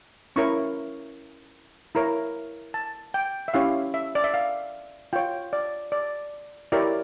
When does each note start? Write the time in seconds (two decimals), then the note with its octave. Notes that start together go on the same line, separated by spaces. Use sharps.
0.36 C#4 E4 A#4 C#5 C#6
1.95 E4 A#4 C#5 A#5
2.74 A5
3.14 G5
3.48 E5
3.54 C#4 E4 G4 C#5 F5
3.94 E5
4.15 D5
4.24 E5
4.34 F5
5.13 F4 C#5 G5
5.53 D5
5.92 D5
6.72 E4 G4 A#4 C#5 D5